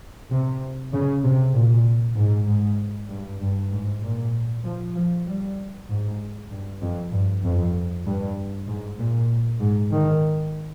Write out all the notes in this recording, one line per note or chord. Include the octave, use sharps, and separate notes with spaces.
C3
C#3
C3
A#2
G#2
G#2
G2
G2
G#2
A#2
F3
F3
G3
G#2
G2
F2
G2
F2
G2
G#2
A#2
G#2
D#3